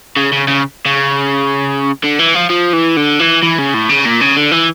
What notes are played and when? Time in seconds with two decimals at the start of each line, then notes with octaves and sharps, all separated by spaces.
0.16 C#3
0.32 C#3
0.48 C#3
0.86 C#3
2.04 D3
2.19 E3
2.34 F3
2.50 F3
2.73 E3
2.96 D3
3.19 E3
3.42 E3
3.58 C#3
3.74 A2
3.90 C#3
4.06 A#2
4.21 C#3
4.37 D3
4.51 E3